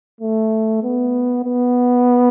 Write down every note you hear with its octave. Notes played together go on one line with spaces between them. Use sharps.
A3
B3
B3